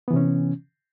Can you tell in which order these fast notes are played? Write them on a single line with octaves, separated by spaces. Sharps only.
B3 E3 C3 C#4